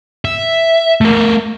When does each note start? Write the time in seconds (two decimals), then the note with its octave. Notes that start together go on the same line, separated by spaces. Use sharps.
0.25 E5
1.01 A3 A#4